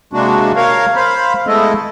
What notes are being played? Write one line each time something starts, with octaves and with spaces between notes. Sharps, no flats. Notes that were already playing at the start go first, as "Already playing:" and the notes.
C3 G#3 A#3 D4 F#4
A#4 C#5 F5
C5 F5 B5
G#3 A3 B3 E4 A4 D#5